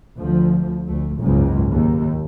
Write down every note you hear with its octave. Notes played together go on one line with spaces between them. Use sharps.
D2 F3
D2 A3
F#1 C#2 G#2 C#3 G#3
D#2